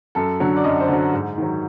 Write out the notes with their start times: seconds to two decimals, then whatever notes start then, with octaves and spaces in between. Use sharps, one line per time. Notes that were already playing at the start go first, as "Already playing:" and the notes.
0.15 F#2 A4
0.40 D3 F#3
0.56 D5
0.64 F#2 D#5
0.80 C5
0.88 D3 F#3
1.13 G#2
1.38 D#3 F#3